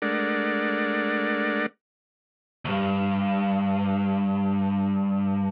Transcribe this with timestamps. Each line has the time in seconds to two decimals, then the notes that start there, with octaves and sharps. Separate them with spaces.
0.02 G#3 A3 D4 A#4 D5 F#5
2.65 D2 G2